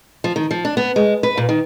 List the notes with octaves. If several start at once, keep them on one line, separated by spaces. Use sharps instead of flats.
F3
D#3
F3
D4
B3
G#3
B4
A#2
D#3